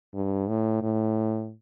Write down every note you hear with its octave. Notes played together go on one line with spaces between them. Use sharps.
G2
A2
A2